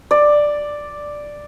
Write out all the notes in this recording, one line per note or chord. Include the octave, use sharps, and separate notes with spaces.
D5